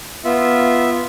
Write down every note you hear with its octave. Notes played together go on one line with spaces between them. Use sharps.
B3 F4 E5